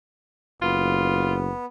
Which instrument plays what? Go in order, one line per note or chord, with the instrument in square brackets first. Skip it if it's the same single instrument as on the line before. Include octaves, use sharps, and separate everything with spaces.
[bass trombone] F#1 [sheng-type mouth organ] B3 [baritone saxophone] F4